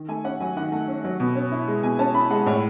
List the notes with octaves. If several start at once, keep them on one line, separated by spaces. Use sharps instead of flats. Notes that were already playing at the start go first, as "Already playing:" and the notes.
Already playing: D#3
A3 G#5
C#4 F#5
F#3 G#5
D#3 F#5
A3
C#4
F#3
B2
C#4
E4
G#3
B2 G#5
C#4 A5
E4 B5
G#3 F#5
A2 C#5